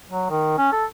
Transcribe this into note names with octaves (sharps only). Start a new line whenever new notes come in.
F#3
D#3
C#4
A4